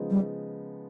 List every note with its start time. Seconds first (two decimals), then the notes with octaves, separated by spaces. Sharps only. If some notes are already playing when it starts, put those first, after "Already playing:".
Already playing: C#3 F3 G#3 B3 D#4
0.10 G3